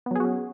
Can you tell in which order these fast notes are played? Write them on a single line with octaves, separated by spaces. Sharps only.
B3 F#3 G#4 F#4 C#4